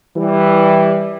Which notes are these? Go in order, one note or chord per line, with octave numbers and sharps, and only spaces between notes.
E3 G3